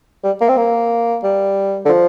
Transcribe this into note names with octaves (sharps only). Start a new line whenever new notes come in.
G3
A#3
C4
A#3
G3
D3
F3